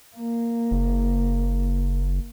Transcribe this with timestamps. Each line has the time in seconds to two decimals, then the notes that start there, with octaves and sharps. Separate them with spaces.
0.16 A#3
0.71 F#1